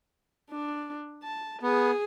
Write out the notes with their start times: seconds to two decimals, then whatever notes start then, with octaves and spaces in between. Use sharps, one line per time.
0.51 D4
1.23 A5
1.62 B3 G#4